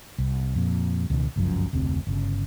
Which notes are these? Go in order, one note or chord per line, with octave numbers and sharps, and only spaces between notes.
C2
F2 A#2
C#2 B2 D#3
G1 C#2 F#2 F3
F1 D2 C3 C4
G1 C#3